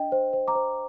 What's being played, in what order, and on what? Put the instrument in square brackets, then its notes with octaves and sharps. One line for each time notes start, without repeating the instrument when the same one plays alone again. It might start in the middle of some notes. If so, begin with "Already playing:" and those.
Already playing: [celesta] D4 D#5 G5
C5
C5
A#5 D6
C5